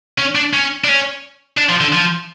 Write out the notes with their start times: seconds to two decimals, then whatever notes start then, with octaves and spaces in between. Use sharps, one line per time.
0.18 C#4
0.35 D4
0.53 C#4
0.84 D4
0.88 C#4
1.57 D4
1.69 F3
1.81 D3
1.93 F3